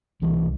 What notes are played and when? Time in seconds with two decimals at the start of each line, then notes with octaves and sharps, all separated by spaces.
0.22 C2 B2 E3